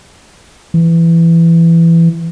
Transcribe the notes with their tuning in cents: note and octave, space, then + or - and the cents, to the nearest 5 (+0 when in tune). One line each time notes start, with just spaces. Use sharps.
E3 +15